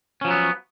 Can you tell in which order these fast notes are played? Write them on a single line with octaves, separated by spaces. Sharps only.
C#4 F3 F#3 B3